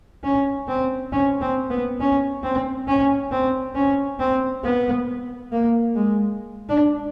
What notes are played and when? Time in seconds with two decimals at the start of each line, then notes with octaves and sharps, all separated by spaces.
0.24 C#4
0.68 C4
1.12 C#4
1.41 C4
1.70 B3
2.00 C#4
2.43 C4
2.88 C#4
3.32 C4
3.75 C#4
4.19 C4
4.64 B3
5.52 A#3
5.96 G#3
6.69 D4